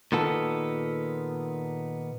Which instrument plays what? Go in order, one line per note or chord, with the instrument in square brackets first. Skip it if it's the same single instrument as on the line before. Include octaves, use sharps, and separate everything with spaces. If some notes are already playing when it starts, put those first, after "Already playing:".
[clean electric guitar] A#2 D#3 B3 A4